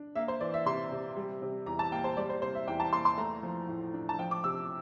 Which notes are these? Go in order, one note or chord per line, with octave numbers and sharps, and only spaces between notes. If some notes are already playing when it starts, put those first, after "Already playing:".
Already playing: D4
A#3 E5
C5
E3 D5
E5
C3 C6
C3
G3
C3
E2 A#5
A5
A#3 G5
C5
G3 D5
C5
C3 C5
E5
E2 G5
A5
A#3 C6
C6
A3 A#5
F3
A2
D4
A5
F3 G5
D6
C3 E6